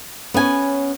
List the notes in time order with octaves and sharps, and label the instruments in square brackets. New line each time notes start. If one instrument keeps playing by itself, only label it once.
[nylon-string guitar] B3 G#5 [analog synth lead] C#4